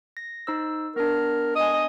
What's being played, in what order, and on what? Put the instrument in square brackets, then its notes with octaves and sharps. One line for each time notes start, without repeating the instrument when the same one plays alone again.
[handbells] A#6
D#4 C5 E6
[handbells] B3 D4 [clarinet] A#4
[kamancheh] D#5 G#5 [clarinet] D#6